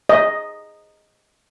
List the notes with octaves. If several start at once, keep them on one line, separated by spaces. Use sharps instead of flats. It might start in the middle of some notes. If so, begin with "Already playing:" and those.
D#5